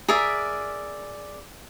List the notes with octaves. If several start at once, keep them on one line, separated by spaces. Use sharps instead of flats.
G#4 A#4 D5 E5